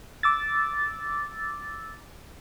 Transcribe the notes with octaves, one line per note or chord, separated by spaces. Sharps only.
D6 E6 A6